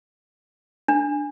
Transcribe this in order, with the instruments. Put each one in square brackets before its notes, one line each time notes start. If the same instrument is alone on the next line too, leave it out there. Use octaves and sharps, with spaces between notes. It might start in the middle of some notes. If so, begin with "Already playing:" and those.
[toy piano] D4